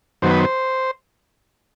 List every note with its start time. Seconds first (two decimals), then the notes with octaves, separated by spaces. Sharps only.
0.22 F#2 D#3 F#3 B3 C5
0.31 B4
0.39 C5